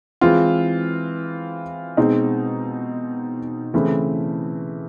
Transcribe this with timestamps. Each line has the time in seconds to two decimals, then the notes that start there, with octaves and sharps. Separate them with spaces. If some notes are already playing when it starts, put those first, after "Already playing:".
0.21 E3 G#3 C4 F4
1.97 B2 G#3 C4 D#4
3.74 C#3 E3 A3 C4 E4